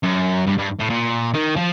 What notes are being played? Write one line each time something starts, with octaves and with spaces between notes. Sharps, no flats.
F#2
G2
G2
A2
A#2
D#3
F3